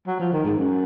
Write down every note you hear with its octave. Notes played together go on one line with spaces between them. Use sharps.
F#3
F3
D#3
G#2
F#2